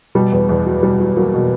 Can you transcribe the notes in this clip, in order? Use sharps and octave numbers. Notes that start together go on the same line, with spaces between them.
B2 G3
E2
E2
F#3
B2 G3
F#3
F#3 A#3
B2